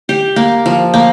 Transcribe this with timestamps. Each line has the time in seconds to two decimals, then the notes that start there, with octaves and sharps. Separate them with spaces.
0.09 G4
0.36 A#3
0.66 F3
0.94 A#3